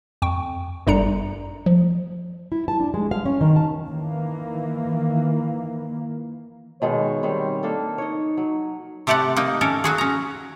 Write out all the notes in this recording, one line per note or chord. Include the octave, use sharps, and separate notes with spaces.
F2 G5 C#6
G1 F#2 G3 D4 A#5 C#7
F3
E4
A5
D4
G#3
F5
C#4
D#3
A5
D#3 E3 A#3
B2 D#3 G#3 C#5
D#3 G3 C4
A#3 D4 A4
D#4 C#5 D#5
F#3
C3 A3 G4 A4 D5 F#5
A#3 D#4 G5
C#4 A4 A#4 C#5
F#3 F#4 G#4
C#4 A#5